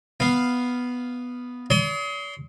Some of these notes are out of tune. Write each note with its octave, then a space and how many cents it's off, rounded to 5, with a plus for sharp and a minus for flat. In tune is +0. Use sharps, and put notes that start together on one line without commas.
B3 +0 F5 +0
D5 -45 C6 +0 D#6 +35